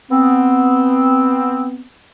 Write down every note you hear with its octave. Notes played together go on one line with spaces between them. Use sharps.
B3 C4